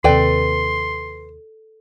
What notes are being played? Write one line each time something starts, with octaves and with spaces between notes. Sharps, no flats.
D#2 C3 A4 B4 D5 G5 C6